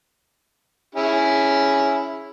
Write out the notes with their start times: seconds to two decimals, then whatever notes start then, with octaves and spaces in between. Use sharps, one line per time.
0.95 C#4 E4 G#4